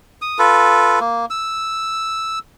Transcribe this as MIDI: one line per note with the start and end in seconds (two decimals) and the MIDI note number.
0.22 0.38 87
0.39 0.99 65
0.39 0.99 69
0.39 0.99 71
1.00 1.25 58
1.30 2.39 88